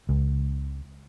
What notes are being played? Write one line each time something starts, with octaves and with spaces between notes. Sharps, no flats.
C#2